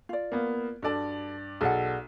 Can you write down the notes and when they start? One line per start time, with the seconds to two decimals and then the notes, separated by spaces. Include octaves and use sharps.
0.09 F4 D5
0.32 A#3 B3
0.82 G2 F#4 A4 D5 A5
1.61 B1 G#4 A4 D5 F#5